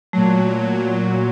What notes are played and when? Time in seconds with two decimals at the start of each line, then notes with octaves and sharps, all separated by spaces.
0.13 A#2 F#3 A3